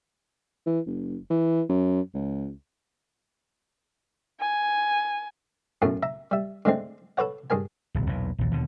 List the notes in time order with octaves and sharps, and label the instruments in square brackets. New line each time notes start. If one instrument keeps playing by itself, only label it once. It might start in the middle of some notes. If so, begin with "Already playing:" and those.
[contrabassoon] E3
F#1
E3
F#2
C#2
[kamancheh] G#5
[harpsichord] B1 F#2 A2 F#3 A3
E5 A#5
G3 E5
D3 G#3 A3 C4
A4 B4 C#5 F#5
G2 G#4 A#4 G#5
[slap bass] D1 B1
B1 E2 A#2
A#1 D#2
D#2 B2 D3